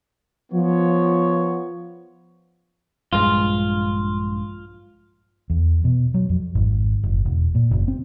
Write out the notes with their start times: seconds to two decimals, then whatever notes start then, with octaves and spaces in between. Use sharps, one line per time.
0.53 F3 B3 C#5
3.13 A#1 G2 G#3 F4
5.50 E2
5.84 B2
6.14 F#3
6.29 F2
6.55 G#1
7.03 F#1
7.25 E1
7.55 A#2
7.71 F#1
7.88 C4